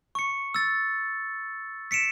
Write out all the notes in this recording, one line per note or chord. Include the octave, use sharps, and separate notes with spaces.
C#6 C#7
E6 A6
B6 C#7 D7 E7